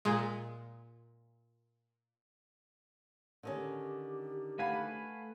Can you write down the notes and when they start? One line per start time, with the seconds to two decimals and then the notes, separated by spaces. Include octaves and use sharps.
0.05 A#2 G#3
3.43 D3 D#3 C#4 G4
4.59 A3 B4 F5 F#5 G#5 B5